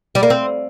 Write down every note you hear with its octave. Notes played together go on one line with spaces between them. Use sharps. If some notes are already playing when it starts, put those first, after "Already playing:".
G3
A#3
C4